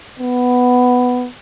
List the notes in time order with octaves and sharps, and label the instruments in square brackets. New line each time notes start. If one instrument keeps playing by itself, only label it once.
[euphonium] B3